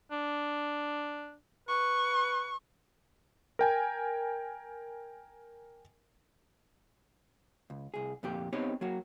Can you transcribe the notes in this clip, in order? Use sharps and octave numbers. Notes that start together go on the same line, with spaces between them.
D4
B4 C#6
A#4 G5 G#5
C#2
C2 G#4
F2 A#2 G4
B3 C4 D#4 G4 C#5
F#3 A#3 F#4